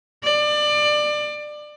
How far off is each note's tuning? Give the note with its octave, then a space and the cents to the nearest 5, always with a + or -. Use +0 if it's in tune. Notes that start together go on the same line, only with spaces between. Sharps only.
D5 +25